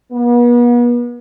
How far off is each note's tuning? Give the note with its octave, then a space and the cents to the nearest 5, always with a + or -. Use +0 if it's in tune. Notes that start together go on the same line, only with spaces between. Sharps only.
B3 -40